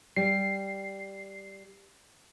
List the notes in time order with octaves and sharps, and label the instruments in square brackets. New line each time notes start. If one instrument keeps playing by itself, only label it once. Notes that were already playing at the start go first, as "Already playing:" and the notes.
[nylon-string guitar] G3 [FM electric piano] C7